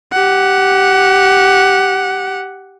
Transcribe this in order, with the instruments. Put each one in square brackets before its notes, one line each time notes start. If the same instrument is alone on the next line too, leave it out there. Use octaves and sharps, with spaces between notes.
[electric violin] G4 F#5